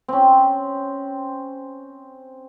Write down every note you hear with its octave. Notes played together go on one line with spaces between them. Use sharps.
C4 C#4